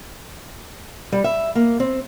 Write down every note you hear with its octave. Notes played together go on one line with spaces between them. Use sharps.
G3
E5
A#3
C4